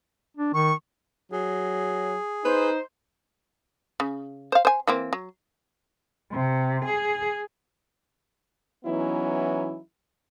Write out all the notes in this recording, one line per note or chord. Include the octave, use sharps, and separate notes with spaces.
D4
D#3 C#6
F#3 G#4
D#4 B4 C5
C#3
C5 F5
C5 G#5
E3 A#3 C4
F#3
C3
G#4
E3 F#3 B3 C#4 D#4 E4